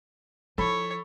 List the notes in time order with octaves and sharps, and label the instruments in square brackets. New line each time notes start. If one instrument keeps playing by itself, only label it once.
[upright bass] F3 E4 [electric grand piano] A4 B5 [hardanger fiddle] C#5